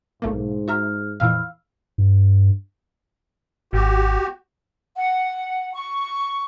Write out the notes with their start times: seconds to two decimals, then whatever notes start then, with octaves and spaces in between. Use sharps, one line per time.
0.22 B1 G#2 A3 A#3
0.68 F#4 G#4 E5 A#5 F6
1.20 F2 A#2 E3 F5 B5 E6 F6
1.98 G2
3.73 G#1 F#4 G4
4.94 F#5
5.73 C#6